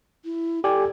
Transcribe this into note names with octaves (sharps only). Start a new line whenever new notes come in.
E4
G4 A4 D5 G#5